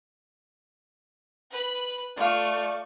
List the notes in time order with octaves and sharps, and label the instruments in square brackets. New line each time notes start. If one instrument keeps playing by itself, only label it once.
[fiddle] B4 B5
[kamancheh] A3 C#6 [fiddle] F4 [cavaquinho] D5 F5